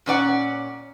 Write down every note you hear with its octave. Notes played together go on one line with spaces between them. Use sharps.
A#2 C#4 D5 F#5